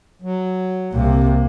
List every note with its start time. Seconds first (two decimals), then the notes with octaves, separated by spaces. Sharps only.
0.22 F#3
0.92 C2 C3 A#3